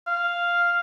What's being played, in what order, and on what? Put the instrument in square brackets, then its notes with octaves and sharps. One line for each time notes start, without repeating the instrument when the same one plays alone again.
[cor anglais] F5